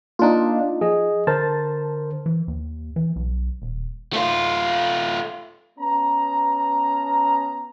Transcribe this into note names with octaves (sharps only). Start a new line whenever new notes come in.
A#3 D4 D#4 F4
F3 G#4 D#5
D3 A#4 C5 A5
E3
D#2
E3
B1
D#1
A3 F4
B3 C#4 A5 A#5